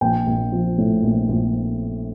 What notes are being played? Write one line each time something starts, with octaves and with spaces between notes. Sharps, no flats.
A#1 G5
A#1
F3
A2
A#1
A#1